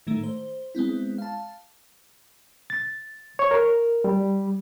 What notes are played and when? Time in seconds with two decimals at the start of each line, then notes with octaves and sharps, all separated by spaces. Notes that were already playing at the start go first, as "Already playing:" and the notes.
0.07 A2 D#3 A3
0.23 C5
0.75 G#3 B3 C4 E4
1.18 F5 A5
2.70 A6
3.39 C#5
3.51 A#4
4.04 G3